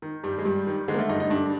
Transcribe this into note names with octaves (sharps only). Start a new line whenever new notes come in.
D#3
G2 G3
G#3
G2 G3
D#3
D3 G#3
A#3
A3
G2 D#4
D#4
G2 D4